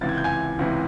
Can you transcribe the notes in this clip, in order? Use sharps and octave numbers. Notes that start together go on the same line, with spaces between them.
C#2 C3 E3 A6
G#6
G6
G#5 G#6
C#2 C3 E3